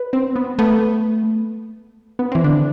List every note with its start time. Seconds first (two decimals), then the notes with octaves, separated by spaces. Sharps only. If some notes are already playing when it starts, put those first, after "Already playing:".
Already playing: B4
0.13 C4
0.36 B3
0.59 A3 B3
2.19 B3
2.32 E3 C4
2.44 D3 D4